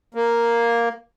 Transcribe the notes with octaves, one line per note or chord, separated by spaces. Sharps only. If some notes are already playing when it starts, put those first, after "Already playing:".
A#3